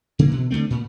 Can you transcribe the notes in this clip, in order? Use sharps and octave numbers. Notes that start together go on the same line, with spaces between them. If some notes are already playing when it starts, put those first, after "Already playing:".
C#3 E3 A#3
B2
D3 F#3 A3 C4
A#2